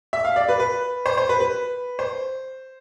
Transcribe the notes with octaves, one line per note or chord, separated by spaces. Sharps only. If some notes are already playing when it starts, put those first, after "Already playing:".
E5
F5
D5
B4
B4
C5
C5
B4
B4
C5